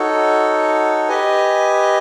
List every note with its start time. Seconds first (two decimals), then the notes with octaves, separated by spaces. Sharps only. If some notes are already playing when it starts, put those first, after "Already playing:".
Already playing: D#4 F#4 A4 C#5
1.09 G4 B4 D#5 G#5